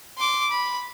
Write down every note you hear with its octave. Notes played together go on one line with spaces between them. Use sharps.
C6 D6
B5